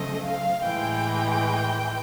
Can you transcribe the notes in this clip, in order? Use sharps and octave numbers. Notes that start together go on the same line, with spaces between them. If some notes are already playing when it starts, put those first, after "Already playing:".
Already playing: C#3 F#3 A3 C4 D#5
F5
A2 E3 G#3 G5